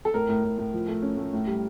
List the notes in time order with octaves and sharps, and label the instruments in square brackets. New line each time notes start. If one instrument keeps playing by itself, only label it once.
[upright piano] A4
A2 A#4
A2
A2
A2
F3
A3
C#4
A3
A2
G3